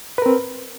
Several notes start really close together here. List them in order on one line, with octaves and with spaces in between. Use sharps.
B4 A#4 C4